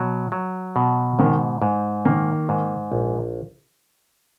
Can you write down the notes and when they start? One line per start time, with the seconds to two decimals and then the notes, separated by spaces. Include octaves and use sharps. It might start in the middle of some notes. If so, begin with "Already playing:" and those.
Already playing: B2 F#3
0.32 F#3
0.76 B2
1.19 G#2 D#3
1.62 G#2
2.05 D#3 A#3
2.49 G#2
2.92 A#1